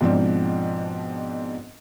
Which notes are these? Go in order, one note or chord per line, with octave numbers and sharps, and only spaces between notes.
G#2 B2 F3 C4 D4